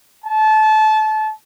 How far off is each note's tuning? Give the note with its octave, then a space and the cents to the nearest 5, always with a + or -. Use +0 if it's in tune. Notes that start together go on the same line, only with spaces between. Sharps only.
A5 -25